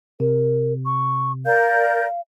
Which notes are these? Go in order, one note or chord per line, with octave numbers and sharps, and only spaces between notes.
C3 A#4
C#6
A#4 D5 F5 G6